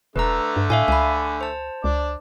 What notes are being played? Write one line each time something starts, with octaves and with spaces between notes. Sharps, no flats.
E1 D3 A3 B4 A#5
G2
A2 E5 F5 G#5
C#2 G#5 B5
C5 A5
C#2 D4 D5